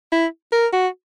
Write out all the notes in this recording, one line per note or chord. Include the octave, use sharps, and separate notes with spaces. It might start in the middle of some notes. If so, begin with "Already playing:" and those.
E4
A#4
F#4